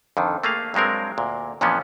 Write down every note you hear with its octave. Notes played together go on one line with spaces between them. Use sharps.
F2 D3 D#3
A3 A#3 G#4 F5
G2 F#3 G#3 C4 A#4
D2 A#2
F2 A#2 E3 F3 B3 C#4